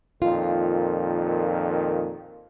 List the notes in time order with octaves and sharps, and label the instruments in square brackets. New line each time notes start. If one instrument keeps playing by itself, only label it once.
[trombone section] F2 A#2 D#3 [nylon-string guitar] F4